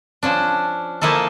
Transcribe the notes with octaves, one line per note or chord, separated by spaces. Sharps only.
F3 C#4 D4
F3 A#3 E4 G#4 A4